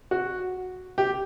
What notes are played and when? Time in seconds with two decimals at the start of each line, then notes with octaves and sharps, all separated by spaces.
0.11 F#4
0.98 G4